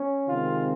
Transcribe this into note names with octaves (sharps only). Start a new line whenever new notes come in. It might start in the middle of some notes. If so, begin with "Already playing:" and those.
Already playing: C#4
C3 D#3 G#3 C4 F4